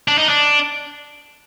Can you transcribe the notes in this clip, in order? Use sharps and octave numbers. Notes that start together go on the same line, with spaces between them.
D4
D#4
D4